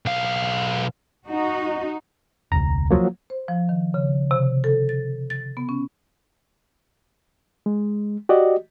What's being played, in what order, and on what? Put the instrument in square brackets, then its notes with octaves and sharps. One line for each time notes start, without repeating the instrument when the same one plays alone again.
[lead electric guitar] B1 F5
[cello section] D#4 F#4
[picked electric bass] E1 C#2 [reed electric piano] A#5
[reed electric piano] F3 F#3 A#3
[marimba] C5
F3
D#3
C#3
C3
A4
A6
A6
B3
C#4
[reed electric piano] G#3
F#4 G4 D5 D#5